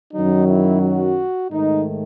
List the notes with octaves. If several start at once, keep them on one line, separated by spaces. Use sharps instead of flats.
F#2 D#3 F#3 D#4
E4
F#4
G#2 D#3 A3 D#4